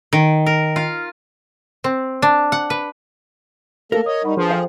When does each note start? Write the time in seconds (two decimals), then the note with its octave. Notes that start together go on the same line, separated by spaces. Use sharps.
0.13 D#3
0.46 A#4
0.76 F4
1.84 C4
2.22 D4
2.52 F#5
2.70 B4
3.92 A3 A#3 A4 A#4 F5
4.06 C#5 D#5 D#6
4.24 G3 D#4 F#5 B5 C#6
4.37 F3 D4 G#4 B4
4.51 A4 C5 F5 G5